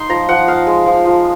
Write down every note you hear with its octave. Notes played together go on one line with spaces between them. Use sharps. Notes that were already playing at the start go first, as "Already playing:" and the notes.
Already playing: D#4 C6
F3 A#5
F3 F#5
D#4 F5
G#3
F3
F3